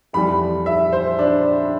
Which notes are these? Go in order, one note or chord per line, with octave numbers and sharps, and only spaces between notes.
F2 E3 G3 B5
E5
C5
D4